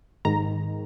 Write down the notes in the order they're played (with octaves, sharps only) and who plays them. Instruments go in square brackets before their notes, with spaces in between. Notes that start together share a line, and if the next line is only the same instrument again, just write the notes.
[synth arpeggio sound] G#1 G#2 D#3 A#5